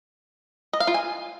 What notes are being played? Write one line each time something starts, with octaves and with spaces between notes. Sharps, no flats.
D#5
F5
F4
G#5